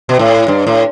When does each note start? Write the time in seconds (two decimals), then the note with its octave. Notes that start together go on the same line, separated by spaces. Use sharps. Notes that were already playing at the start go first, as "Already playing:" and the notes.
0.09 B2
0.19 A2
0.48 G2
0.67 A2